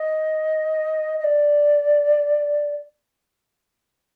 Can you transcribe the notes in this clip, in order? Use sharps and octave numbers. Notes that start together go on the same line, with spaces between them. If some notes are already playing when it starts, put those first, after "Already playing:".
Already playing: D#5
D#5
D5